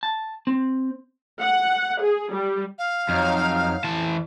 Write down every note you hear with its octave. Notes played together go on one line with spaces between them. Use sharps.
A5
C4
F#5
G#4
G3
F5
F2 F#3 D#4 F6
F2 E3 A5